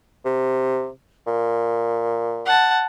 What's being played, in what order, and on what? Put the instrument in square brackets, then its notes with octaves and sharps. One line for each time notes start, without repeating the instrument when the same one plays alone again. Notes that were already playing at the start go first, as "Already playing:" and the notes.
[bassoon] C3
A#2
[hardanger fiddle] F#5 A5